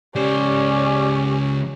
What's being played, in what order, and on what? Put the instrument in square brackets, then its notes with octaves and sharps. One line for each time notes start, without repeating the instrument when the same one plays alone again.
[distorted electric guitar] C#2 C5 [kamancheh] C#4 [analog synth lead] G4 [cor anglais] D5